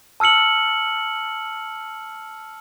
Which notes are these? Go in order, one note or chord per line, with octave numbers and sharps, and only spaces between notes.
A5 E6 F6 C#7 F#7